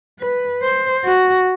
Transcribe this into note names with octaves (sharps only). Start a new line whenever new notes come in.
B4
C5
F#4